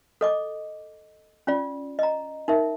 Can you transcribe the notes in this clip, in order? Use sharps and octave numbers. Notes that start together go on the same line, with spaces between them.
A4 D#5 D6
C#4 F4 D5
D#5 A#5
D#4 A#4 E5